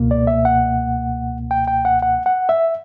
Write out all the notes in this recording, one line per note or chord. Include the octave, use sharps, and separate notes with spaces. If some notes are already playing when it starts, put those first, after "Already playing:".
Already playing: C#2 B2 A#3
D5
E5
F#5
G5
G5
F#5
F#5
F#5
E5